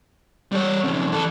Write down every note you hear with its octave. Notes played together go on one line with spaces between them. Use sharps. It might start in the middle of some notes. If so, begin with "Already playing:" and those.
G3 C#5
F2 C#3
E3 A4